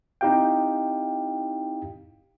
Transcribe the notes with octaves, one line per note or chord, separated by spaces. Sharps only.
C4 D#4 E4 G4 F5 G5